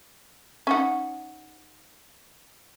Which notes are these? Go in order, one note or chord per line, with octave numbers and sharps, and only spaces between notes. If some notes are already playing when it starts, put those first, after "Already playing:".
C#4 D#4 F#5